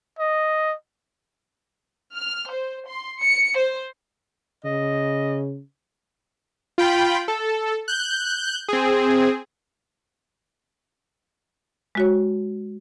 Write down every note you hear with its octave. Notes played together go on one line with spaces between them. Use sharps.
D#5
F6
C5
C6
C#7
C5
C#3 D#5
F4 G5 B5
A4
F#6 G6
C4 G#4
G#3 F#4 C#5